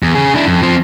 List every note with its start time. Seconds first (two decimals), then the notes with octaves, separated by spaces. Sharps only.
0.03 E2
0.15 C#3 G#4
0.34 D4 E4
0.47 F2
0.62 F3 C4